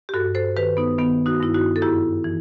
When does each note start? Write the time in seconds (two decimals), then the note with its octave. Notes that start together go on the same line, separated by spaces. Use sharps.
0.09 G4
0.14 G2 F#4 A4
0.35 A4 C5
0.57 D#3 G4 B4
0.77 B3 D#4
0.98 D#3 B3
1.26 D#4 F#4
1.41 G2 E4
1.54 D#4 F#4
1.76 A4
1.82 F#2 E4 G4
2.24 E3